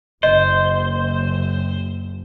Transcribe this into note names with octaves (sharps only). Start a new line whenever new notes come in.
F#1 C5 D#5